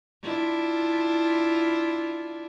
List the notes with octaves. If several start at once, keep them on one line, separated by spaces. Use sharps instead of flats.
D4 E4 F4